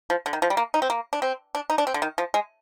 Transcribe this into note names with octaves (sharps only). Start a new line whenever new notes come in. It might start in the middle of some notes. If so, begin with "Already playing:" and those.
F3
D3
D#3
F3
G3
A#3
D#4
C4
A#3
D4
C4
D4
D#4
D4
C4
D3
D#3
F3
G#3